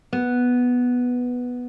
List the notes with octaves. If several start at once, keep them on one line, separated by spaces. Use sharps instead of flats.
B3